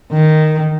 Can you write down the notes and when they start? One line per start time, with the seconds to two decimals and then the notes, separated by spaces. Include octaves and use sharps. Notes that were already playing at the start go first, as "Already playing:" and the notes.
0.12 D#3